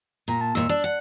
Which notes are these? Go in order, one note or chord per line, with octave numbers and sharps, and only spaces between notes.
A#2 A#5
A5
D#2 A#2 E6
D4
F#5 F#6